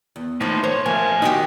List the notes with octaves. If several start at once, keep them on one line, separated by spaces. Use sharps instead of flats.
E2
A2 E3 F3 A#3 D#4
C5 C#5
A1 F3 A3 A#3 G#5
D#3 D#4 F#4 G4